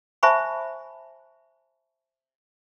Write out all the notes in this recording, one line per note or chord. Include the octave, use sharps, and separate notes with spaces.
C5 E5 G#5 A5 B5 C#6